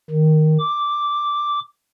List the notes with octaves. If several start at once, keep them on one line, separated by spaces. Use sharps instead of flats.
D#3
D6